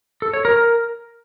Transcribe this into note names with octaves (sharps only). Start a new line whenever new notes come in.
A4
C#5
A#4